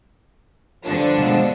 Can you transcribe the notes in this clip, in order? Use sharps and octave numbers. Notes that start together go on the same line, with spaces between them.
G2 D3 F3 D4 F4 C5
B2 F#3 G#3